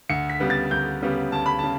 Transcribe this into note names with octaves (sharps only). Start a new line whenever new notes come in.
D2 C#7
B6
C#3 G3 B3
A6
D2 G6
C#3 G3 B3
D2 A5
B5
C#3 A5